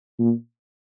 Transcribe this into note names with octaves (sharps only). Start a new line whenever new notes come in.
A#2